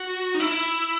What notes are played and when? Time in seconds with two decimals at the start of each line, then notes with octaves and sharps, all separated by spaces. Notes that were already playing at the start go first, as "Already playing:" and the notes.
Already playing: F#4
0.34 D#4
0.40 E4